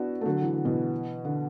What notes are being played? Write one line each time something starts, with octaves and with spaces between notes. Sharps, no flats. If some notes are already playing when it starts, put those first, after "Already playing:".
Already playing: B3 D4 E4 F#4
A3
D3 F#3
E3
D3
B2 E3
D3